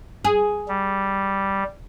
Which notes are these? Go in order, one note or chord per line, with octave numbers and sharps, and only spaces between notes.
G#4
G3